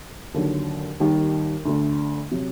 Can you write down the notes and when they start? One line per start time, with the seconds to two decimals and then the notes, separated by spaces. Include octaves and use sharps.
0.34 D#2 D3 F#3
1.00 D#2 D#3 G3
1.65 D2 D3 A3
2.31 C3 F#3